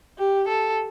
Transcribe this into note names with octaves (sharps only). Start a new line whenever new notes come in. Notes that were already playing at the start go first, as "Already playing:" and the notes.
G4
A4